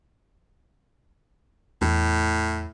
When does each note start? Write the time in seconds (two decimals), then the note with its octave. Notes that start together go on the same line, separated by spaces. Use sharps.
1.82 E2 A2